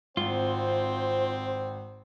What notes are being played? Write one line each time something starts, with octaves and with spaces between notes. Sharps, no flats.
G#1 C4 F4 C5